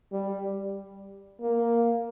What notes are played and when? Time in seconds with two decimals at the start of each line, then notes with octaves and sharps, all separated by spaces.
0.12 G3
1.41 A#3